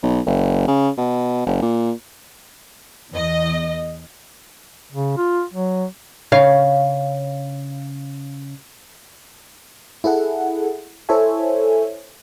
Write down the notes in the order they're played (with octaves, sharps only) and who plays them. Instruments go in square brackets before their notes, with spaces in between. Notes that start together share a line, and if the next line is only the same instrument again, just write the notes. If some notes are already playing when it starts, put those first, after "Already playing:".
[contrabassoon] B1
F#1
C#3
B2
F#1
A#2
[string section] E2 D#5
[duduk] C#3
F4
F#3
[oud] C#3 C#5 F5
[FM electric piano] E4 G#4 A4 F#5
E4 A4 C5 C#5 E5 G#5